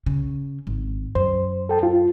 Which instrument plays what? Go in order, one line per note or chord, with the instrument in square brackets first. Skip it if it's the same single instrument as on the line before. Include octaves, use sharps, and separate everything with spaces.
[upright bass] C#3
G#1
[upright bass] F#2 [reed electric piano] C5
[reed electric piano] A4 G5 A5
F4